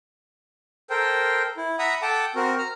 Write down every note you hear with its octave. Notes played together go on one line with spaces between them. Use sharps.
A4 A#4 C5 G5
E4
E5 F#5 A#5 B5 D#6
A4 F#5 G5 A5 D6
C4 F#4 A#4
A#5 F6